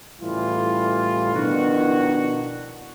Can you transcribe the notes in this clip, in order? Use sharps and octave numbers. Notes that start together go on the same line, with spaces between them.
A2 C#3 E3 G3 E4 F4
B2 D#3 F3 D4 E4 F#4